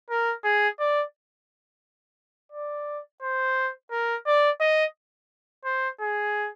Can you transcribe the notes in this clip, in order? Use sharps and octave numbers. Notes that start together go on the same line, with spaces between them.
A#4
G#4
D5
D5
C5
A#4
D5
D#5
C5
G#4